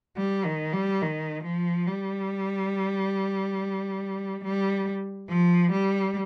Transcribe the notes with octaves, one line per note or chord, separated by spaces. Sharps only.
G3
D#3
G3
D#3
F3
G3
G3
F3
G3